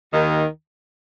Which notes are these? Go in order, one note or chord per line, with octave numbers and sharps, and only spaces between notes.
D#2 D#3